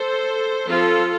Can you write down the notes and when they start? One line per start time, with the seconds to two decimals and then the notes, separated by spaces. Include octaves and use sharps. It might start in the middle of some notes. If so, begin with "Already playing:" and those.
Already playing: A4 C5
0.68 F3 C4 F4 A4